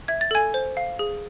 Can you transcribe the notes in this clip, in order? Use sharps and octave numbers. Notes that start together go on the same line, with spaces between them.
E5 G#6
A6
A4 G#5 G#6
C5
F5
G#4